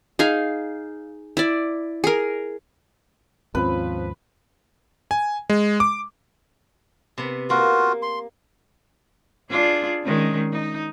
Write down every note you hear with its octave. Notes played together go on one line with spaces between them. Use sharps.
D#4 G#4 F5
E4 D5
G#4 A#4
D#2 G#2 F3 C4 C#4 F4 B4
G#5
G#3
D6
C3 B3
A#3 F4 F#4
C6
D4 F4 G#4
D#3 G#3 C#4
D#4